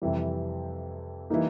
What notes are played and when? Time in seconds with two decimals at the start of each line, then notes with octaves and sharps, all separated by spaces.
0.02 F2 C3 E3 G3
1.30 E3 G3 A#3 D#4